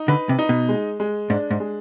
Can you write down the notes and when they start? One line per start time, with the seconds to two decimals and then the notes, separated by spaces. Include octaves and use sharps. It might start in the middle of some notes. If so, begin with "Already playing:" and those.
Already playing: D#4
0.08 D3 B4
0.29 C3
0.39 D#4
0.49 B2
0.69 G#3
1.00 G#3
1.30 G#2 D4
1.51 G#2
1.60 G#3